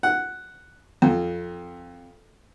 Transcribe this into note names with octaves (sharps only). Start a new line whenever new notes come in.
F#5
F2